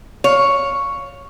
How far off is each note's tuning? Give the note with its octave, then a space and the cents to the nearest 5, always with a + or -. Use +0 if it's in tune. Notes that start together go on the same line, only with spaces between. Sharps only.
C#5 +0 F5 +10